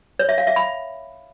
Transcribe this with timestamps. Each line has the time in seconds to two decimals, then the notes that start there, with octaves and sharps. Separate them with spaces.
0.19 C#5
0.29 E5
0.38 F5
0.47 E5
0.56 B5